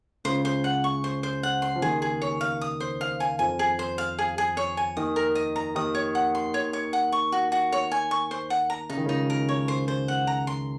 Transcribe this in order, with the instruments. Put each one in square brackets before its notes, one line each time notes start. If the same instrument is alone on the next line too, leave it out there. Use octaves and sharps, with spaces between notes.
[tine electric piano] C#2 C#3 [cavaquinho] C5
[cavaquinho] C5
F#5
C#6
C5
C5
F#5
C6
[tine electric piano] F3
[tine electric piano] D#2 D#3 [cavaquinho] G#4
[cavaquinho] G#4
C#5
F5
D#6
C5
F5
G#5
[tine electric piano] F2 F3 [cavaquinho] G#5
[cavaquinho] G#4
C5
F5
G#4
G#4
C#5
G#5
[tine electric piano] D#2 D#3 [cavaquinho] D#6
[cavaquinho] A#4
D#5
A#5
[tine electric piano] D#2 D#3 [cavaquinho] D#6
[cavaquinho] C#5
F#5
C6
C#5
C#5
F#5
C#6
F#4
F#4
C#5
G#5
C#6
C5
F#5
A#5
[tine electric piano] C#3 [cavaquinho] D#4
[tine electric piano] D#3
[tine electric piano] C#2 C#3 [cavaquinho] D#4
[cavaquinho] A#4
C#5
C5
C5
F#5
A#5
C6